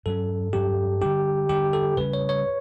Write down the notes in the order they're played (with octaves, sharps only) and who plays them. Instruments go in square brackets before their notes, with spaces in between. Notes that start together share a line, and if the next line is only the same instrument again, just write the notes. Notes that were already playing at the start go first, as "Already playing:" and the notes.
[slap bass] G2 F#3 C#4 [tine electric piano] A4
[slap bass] G2 F#3 C#4 [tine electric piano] G4
[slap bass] D3 G3 D4 [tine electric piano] G4
[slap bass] D3 G3 D4 [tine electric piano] G4
[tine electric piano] A4
[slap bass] C#3 G3 C#4 [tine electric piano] B4
[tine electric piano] C#5
C#5